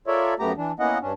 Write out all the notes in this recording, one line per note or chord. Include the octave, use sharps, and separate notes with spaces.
F4 A4 A#4 C#5 D5 E5
F#2 A3 B3 G4 A#5
E3 D4
A#3 B3 C#4 E4 D#5 F#5
G2 C#4 D4